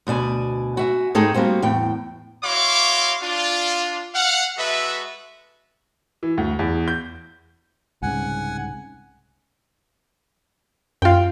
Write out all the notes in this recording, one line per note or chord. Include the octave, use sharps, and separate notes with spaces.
D2 B2 D5 G#5
F#4 E5 G#5
G#2 A3 D#4 G#4 A4 G5
G3 A#3 C4 F#4
E2 A2 G5
E4 F#4 C#5 F5 C6 D6
D4 F4
F5 F#5
G#3 F#4 A4 B4 E5
E3
D2
E2
G6
C2 G#2 C#3 F#5 G#5
F#2 F4 F5 G5